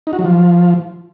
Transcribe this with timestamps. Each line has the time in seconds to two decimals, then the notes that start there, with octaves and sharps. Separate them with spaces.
0.07 D#4
0.13 F#4
0.19 F#3
0.25 F3